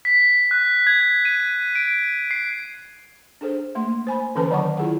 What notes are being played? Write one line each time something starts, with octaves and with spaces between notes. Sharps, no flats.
B6
F#6
G#6
D#7
D7
C7
D4 G#4 A4 C5
A3 A#3 C6
C5 G#5 B5
D3 E3 C#4 A4 B4 A5
D#3 F#3 C#5 F#5 C#6 D6
E4 F4 G#4 A4 F#5